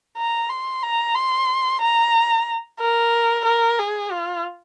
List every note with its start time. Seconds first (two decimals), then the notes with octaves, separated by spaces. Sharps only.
0.17 A#5
0.50 C6
0.83 A#5
1.15 C6
1.82 A#5
2.80 A#4
3.45 A#4
3.79 G#4
4.12 F4